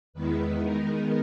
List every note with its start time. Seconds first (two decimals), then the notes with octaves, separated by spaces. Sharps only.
0.14 E2 D#3 G#3 B3 E4 B4
0.59 D#3 G#3 B3 D#4 A#4